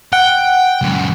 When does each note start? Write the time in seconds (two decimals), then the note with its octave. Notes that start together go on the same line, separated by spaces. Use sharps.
0.13 F#5 G5
0.82 C#2 F#2